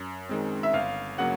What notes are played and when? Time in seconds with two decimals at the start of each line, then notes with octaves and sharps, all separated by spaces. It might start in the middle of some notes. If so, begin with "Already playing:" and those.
Already playing: F#2
0.29 D#3 G#3 C4
0.63 E5
0.73 G1 F5
1.18 C#3 F#3 A#3 F#5